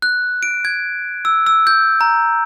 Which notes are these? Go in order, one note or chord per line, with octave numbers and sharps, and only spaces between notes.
F#6
D7
G#6
E6
E6
G6
A#5